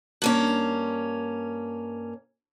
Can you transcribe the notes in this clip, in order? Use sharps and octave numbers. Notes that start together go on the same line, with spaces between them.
G2 A#3 C#4